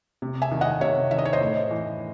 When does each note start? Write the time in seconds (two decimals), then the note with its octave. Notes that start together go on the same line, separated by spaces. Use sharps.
0.22 C3
0.42 E5 G#5
0.51 D#3
0.61 D#5 F#5
0.81 C3 C#5 E5
1.11 D#3 E5
1.18 D#5
1.25 C#5
1.33 C5 D#5
1.41 A2
1.71 E3